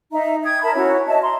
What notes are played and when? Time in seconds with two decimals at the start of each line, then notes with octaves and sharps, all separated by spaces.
0.11 D#4 E5 A#5
0.43 G5 D#6 G#6
0.62 A#4 E5 A5 B5
0.75 C#4 E4 F#4 C#5
1.07 D#5 E5 A5
1.22 A#5 C6